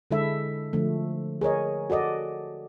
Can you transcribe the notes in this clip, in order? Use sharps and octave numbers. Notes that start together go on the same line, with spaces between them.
D3 G#3 E4 A4 E5
D3 F3 A3
G#4 A#4 C#5 D#5
F#4 A4 D5 D#5